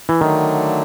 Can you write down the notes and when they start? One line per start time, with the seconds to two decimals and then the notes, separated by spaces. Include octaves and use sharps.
0.09 E3
0.21 D3 D#3 F#3 A3 D4